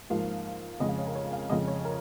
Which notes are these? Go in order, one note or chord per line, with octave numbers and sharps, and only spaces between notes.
G#2 F3 A#3 F5
F2 C#3 G#3 D#5
F5
C#5
A#4
C#5
F5
F2 C#3 G#3 D#5
C#5
A#4